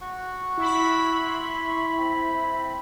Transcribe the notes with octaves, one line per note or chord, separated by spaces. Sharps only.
F#4 F#5 C#6
E4 B5
C6 C#6
C4